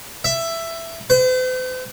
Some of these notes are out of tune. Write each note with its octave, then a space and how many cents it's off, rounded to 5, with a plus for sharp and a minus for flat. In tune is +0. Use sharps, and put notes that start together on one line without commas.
E5 +10
C5 -45